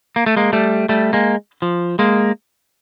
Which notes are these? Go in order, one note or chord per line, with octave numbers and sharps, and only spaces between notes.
A#3
A3
G#3 A#3
G3 A3
G3 A3
G#3 A#3
F3
G#3 A#3